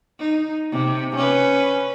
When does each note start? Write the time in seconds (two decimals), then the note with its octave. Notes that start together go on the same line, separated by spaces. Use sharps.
0.19 D#4
0.72 C3
1.16 C#4 B4